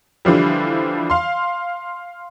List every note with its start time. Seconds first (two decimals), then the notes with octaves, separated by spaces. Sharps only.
0.25 D3 E3 F3 G3
1.10 F5 C6